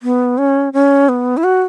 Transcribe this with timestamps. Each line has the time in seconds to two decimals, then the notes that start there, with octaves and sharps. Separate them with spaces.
0.03 B3
0.38 C#4
0.73 C#4
1.09 B3
1.37 E4
1.44 F#4